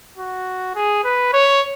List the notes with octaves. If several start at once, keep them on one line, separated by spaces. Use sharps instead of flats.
F#4
G#4
B4
C#5